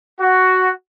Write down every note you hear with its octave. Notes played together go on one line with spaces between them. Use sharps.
F#4